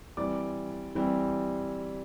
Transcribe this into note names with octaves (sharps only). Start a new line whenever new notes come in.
E3 G3 C4 D5 D6
E3 G3 C4